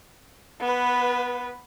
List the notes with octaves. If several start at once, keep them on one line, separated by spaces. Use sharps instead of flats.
B3 B4